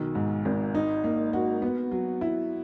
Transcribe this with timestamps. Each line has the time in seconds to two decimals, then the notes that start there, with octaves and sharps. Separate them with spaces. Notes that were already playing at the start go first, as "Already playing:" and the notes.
Already playing: B1 B2 D#3
0.15 G#2
0.45 G#1
0.75 D#4
1.04 A#3
1.33 F#4
1.62 B3
1.91 F#3
2.21 E4